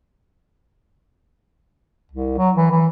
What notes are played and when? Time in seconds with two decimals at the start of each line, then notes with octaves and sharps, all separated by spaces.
2.12 C2
2.38 F#3
2.55 E3
2.71 E3